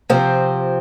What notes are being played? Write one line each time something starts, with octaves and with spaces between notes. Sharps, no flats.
C3 F3 C4